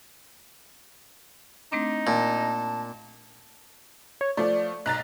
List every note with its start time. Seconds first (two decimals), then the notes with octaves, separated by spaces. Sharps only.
1.72 A3 C4 D4 D#4
2.07 A#2 A5
4.21 C#5
4.37 F3 A3 D5
4.86 B1 A#5 F#6 A6